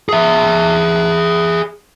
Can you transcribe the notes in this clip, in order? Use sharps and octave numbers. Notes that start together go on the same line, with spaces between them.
G#4 E5